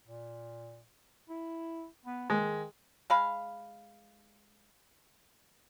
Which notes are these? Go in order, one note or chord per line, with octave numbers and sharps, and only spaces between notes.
A#2
E4
B3
D#3 G#3
G#3 F5 B5